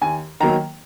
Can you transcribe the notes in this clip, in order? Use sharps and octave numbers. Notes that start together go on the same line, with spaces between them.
D#2 G#5
D#3 F#3 A#3 A#5